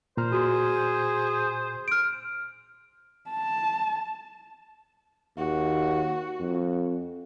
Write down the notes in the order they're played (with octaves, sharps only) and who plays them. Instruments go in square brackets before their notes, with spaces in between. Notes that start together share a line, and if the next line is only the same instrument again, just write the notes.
[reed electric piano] A#2 A#5 F6 [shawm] C5
[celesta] F#4 [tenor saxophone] G#4
[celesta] F6 D7
[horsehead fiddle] A5
[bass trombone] D#2 [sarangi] F#4
[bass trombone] F2